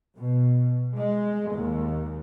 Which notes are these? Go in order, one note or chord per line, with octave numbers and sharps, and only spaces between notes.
B2
G#3
D#2